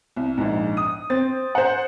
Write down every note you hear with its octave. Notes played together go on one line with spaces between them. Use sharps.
C2
A#1 G#2
D#6
C4 A6
C5 F#5